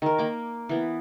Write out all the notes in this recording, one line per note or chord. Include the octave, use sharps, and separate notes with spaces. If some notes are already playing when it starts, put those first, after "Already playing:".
D#3 A#4
A#3 D6
E3 B3